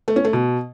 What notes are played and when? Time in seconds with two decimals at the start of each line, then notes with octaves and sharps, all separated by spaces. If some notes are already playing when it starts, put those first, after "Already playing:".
0.08 A3
0.16 C#4
0.25 A3
0.33 B2